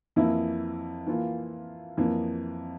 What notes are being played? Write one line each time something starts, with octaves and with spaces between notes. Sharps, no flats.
F2 E3 A#3 E4
E3 A#3 F4
F2 E3 A#3